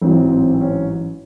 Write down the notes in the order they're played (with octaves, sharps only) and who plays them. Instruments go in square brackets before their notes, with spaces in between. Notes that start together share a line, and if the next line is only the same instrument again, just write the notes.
[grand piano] A1 G#2 F#3 C4
C4
C4
C#4